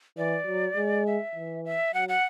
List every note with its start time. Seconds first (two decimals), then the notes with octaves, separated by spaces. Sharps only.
0.17 E3 D5
0.47 F#3
0.77 G#3
1.06 E5
1.36 E3
1.65 E5
1.94 F#3 F#5
2.09 F#5